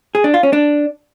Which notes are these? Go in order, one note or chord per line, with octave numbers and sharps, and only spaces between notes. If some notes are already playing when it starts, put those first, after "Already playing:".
G#4
D4
F4
C#4
D4